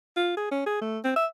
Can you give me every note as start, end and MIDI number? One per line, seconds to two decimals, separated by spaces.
0.16 0.36 65
0.37 0.48 68
0.51 0.62 61
0.66 0.81 68
0.81 0.99 57
1.04 1.12 60
1.16 1.26 76